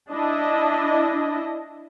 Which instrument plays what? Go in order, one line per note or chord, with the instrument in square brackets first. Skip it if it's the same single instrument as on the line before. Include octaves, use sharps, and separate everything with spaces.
[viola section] D4 E4 D#5